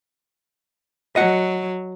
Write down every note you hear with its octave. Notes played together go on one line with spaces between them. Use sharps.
F#3 D#5 F#5